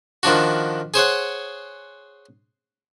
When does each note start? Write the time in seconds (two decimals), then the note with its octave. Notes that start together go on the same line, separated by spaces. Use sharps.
0.23 D#3 F3 D4 F#4
0.94 G#4 C5 C#5 F#5